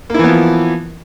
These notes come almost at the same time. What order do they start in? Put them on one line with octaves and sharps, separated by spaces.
A#3 E4 E3 B3 F3